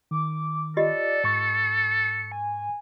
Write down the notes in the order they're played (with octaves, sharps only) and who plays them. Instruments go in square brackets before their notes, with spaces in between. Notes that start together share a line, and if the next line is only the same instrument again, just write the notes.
[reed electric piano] D#3 [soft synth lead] D6
[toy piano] F4 G4 D#5 [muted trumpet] A4 [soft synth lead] D5
[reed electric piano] G#2 C#6 A6 [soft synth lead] C#7
[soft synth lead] G#5